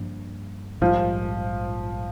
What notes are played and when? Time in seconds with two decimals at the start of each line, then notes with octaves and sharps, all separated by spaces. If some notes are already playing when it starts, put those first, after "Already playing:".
Already playing: G2 F3 A#3 D4
0.81 A#1 G#2 F3 G3